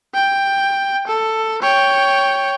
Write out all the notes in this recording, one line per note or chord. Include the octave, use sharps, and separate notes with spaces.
G5
A4
C#5 G5